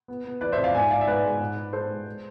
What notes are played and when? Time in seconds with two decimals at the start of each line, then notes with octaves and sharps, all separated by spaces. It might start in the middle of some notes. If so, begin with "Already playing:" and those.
0.08 B3
0.25 B3
0.41 E3 B4 D5
0.52 C5 E5
0.57 F2
0.64 D5 F5
0.75 G#2 E5 G#5
0.91 G#2 D5 F5
1.01 E5
1.07 G#2 B4 D5
1.24 G#3
1.40 G#2
1.57 G#2
1.73 G#2 A4 C5
1.89 G#3
2.06 G#3